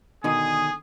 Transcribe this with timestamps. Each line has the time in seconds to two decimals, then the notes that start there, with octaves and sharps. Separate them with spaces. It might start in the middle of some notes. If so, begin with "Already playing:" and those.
0.24 B2 D3 D#3 G#4 D#6